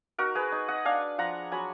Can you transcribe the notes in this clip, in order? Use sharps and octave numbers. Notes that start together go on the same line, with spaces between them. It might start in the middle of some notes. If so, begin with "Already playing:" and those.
D#4 F#4 A#4
G#4 B4
D#4
D#5 F#5
D4 F5 G#5
F3 F#5 A#5
F#3 G#5 B5